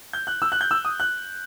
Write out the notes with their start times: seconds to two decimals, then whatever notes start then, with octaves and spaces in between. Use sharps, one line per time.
0.13 G6
0.27 F#6
0.42 E6
0.52 F#6
0.61 G6
0.71 E6
0.85 D#6
1.00 F#6